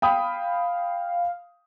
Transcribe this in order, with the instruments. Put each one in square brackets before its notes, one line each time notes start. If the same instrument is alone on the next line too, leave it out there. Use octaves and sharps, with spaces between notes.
[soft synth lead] F5 [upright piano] G5 B5 D#6